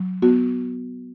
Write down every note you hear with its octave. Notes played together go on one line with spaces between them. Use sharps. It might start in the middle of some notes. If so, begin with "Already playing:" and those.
Already playing: F#3
B3 F#4